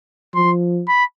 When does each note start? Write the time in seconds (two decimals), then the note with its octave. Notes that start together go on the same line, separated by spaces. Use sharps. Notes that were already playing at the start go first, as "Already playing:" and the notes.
0.34 F3 C6
0.88 B5